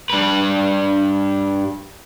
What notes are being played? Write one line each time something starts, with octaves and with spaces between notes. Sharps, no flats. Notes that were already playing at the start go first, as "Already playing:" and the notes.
G2 B4